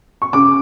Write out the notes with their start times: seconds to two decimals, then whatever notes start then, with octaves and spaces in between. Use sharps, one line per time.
0.22 C#6
0.33 C#3 D6